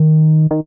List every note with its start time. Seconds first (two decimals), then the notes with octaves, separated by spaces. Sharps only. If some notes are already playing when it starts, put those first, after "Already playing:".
Already playing: D#3
0.51 D#3